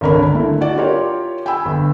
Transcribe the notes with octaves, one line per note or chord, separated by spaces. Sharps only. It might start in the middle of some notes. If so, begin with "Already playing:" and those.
G#1 C#2 D3 A#4 C#5 B5
D3 A3 E4
E4 F#4 D5
F4 G4 A#4 C#5
G5 G#5 B5 E6
G1